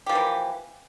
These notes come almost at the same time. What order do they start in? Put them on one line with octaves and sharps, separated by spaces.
G4 F3 A#3 E3